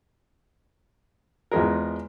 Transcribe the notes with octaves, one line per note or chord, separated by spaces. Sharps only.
E2 F3 G#3 A#4